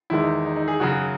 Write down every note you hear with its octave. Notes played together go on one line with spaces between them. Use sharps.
E2 D#3 G#3 E4
D#4
D#4
D#4
G#4
F#2 C#3 F#3 F#4
G#4